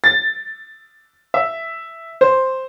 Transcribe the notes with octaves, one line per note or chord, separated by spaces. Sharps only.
A6
E5
C5